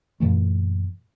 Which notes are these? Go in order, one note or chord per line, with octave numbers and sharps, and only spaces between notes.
F#2 A#2 E3 A3